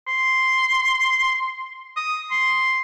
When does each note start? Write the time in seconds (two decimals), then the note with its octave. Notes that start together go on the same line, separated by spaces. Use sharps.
0.08 C6
1.97 D#6
2.31 C6